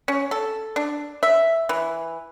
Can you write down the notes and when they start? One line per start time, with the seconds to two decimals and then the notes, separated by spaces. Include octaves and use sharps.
0.08 C#4
0.31 A4
0.76 D4
1.23 E5
1.69 E3